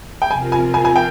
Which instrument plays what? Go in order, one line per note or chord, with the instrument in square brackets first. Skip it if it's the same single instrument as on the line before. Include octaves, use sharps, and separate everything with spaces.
[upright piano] G5
[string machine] C3 F3 C4 F4 A#4 [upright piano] G#5
[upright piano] G#5
G#5
G#5
G5